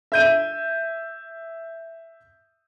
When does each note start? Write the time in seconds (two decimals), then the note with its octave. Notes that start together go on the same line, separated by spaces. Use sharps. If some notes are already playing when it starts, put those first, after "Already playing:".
0.12 E5 G6 D#7